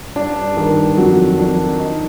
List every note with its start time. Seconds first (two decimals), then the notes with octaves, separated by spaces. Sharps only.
0.16 G2 D4
0.57 D#3
0.98 F2 F#3
1.38 F2 D4
1.79 D#4